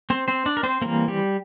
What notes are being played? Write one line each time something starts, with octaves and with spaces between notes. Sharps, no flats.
C4 C5
C4 C5
D4 D5
A#4
C4 C5
E3 G3 A#3 C4 A#4
G3 G4